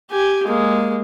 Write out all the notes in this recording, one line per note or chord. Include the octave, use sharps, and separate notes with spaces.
G4 G#5
G#3 A#3